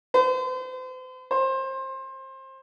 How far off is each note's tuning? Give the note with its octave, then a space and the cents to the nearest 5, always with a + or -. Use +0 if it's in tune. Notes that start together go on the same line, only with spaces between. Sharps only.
C5 -40
C5 +25